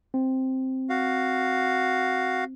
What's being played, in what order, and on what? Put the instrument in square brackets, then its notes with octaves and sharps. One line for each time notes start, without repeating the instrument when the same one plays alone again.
[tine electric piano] C4
[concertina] F#4 F5